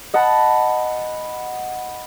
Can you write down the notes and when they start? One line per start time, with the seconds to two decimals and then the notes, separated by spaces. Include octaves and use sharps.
0.14 D#5 F#5 A5 B5